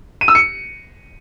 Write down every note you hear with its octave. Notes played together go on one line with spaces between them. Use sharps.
D#7
E6
C#7